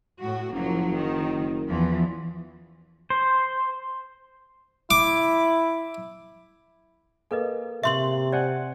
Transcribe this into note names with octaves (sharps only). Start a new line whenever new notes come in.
A2 F#4
F#1 F3 F#3 A#3
D#3
E2 E3 F3
C5
E4 D6
A#3 G#4 A4 B4 D#5
C3 E5 C6 C#6 F#7
C5 D5 F#5 G#5